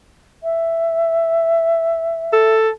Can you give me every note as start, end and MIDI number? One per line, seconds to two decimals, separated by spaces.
0.43 2.55 76
2.33 2.70 69